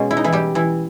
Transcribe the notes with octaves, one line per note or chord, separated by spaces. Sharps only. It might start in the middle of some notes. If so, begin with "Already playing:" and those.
Already playing: B2 G#3 C#4
E4
D#4
E3 E4
G3 G4
E3 E4